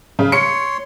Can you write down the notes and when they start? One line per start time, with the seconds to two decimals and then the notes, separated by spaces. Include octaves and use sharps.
0.19 C#3
0.32 C#5 C6 C#7